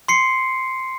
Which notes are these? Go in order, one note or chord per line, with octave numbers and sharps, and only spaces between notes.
C6 C7 C#7